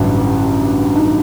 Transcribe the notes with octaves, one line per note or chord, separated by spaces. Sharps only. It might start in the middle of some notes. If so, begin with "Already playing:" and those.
Already playing: A1 G2 D3 F#3
D#4